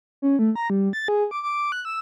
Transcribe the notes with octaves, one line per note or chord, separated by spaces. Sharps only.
C#4
A3
A#5
G3
A6
G#4
D6
D6
F#6
E6